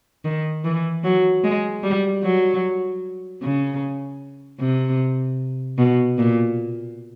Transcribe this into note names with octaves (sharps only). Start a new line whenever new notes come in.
D#3
E3
F#3
G#3
G3
F#3
C#3
C3
B2
A#2